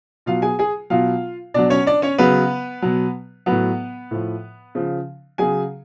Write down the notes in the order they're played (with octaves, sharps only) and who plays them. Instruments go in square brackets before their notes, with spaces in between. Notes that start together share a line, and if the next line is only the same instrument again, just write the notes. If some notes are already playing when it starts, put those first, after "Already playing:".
[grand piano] B2 F#3 F4 F5
G#4 G#5
G#4 G#5
B2 F#3 F4 F5
B2 F#3 D4 D5
C#4 C#5
D4 D5
C#4 C#5
C#3 F#3 B3 B4
B2 F#3
A2 F#3 B3 B4
A2 F3
C#3 F3
C#3 F#3 G#4 G#5